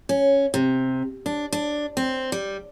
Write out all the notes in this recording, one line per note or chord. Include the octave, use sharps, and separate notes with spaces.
C#4
C3
D4
D4
C4
G3